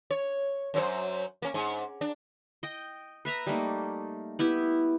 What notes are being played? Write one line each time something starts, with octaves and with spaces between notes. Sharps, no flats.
C#5
F#2 F#3 C5
A#3 C#4
G#2
D4
D#5 G5
B4 E5 A#5
G3 A3 A#3 D#4
B3 E4 G4